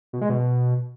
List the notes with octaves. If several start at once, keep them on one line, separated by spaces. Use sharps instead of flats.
B2
G#3
B2